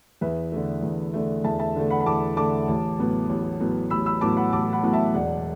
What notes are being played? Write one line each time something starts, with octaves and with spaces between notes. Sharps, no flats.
E2 B4 E5
D3 A3
E2
D3 A3
E2 E5 A5
E5 A5
D3 A3
F#5 B5
B5
E2 A5 D6
D3 A3 A5 D6
A1
A2 F#3 B3
A1
A2 F#3 B3
A1 B5 E6
B5 E6
A2 F#3 B3 A5 D6
F#5 B5
A1 A5 D6
F#5 B5
A2 F#3 B3
E5 A5
E1 D5 F#5